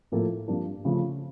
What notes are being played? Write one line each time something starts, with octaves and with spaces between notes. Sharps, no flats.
A2 F3 A#3 E4 A4
G2 F3 A#3 D4
C#3 F3 A3